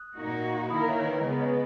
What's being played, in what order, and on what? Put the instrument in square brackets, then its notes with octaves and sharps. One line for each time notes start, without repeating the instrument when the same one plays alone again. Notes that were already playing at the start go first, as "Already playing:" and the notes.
Already playing: [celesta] D#6 F#6
[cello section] A#2 A#3 D#4 F#4
[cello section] D#3 A#3 E4 A#4 [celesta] B5 D#6
[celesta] C#5 E5
C#5
B4 D#5
[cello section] C#3 G#3 B3 [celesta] C#5
[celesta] B4 D#5